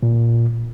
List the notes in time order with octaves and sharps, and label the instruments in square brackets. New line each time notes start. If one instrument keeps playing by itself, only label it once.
[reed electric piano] A#2